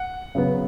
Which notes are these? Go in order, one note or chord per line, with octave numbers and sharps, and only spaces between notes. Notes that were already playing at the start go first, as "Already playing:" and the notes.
Already playing: F#5
C#3 F#3 B3